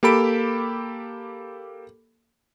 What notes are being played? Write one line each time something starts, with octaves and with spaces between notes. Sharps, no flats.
A#3 G4 A4 B5 D7